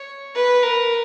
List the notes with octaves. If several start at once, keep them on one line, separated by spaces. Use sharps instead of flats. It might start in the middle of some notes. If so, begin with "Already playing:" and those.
Already playing: C#5
B4
A#4